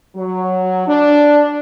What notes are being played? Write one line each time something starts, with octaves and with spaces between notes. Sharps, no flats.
F#3
D4